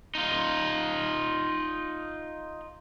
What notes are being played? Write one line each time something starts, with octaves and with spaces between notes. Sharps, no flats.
D#4 F4